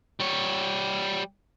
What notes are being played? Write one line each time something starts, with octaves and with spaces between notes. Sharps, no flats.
G3 C#5